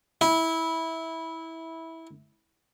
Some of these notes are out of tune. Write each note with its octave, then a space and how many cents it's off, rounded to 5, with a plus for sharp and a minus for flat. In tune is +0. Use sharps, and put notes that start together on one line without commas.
E4 -15